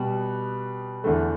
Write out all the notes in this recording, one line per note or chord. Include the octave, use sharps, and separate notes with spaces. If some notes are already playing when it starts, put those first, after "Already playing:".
Already playing: B2 G3 B3
E2 D3 A3